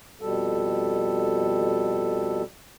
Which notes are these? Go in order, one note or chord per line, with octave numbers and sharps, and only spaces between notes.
F2 B2 G3 A4